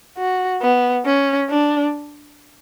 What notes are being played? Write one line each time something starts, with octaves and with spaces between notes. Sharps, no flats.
F#4
B3
C#4
D4